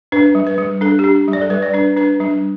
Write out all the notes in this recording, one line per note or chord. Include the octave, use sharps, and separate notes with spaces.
D4 B4
G3
B4
G3
D4 A4
G4
D4
G3
D5
A4
G3 B4
D5
D4 B4
D4 B4
G3 D4